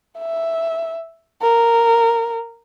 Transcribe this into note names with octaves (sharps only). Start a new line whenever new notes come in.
E5
A#4